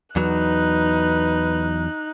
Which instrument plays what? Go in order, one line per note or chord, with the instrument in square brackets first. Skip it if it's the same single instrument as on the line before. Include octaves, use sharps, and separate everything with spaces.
[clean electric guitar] E2 F#3 [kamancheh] D#4 F#6 [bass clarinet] B4